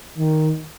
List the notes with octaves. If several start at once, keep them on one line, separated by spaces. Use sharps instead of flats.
D#3